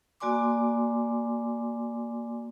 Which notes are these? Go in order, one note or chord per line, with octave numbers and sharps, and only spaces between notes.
A#3 F#4 D5 G#5 C6 D6